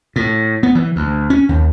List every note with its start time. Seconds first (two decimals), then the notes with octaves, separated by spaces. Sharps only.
0.16 A2
0.63 B3
0.75 E3
0.96 D2
1.30 C#4
1.49 D#2